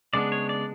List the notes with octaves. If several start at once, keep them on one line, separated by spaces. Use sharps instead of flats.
C#3 G#3 B3 D4 D5
C#5
D5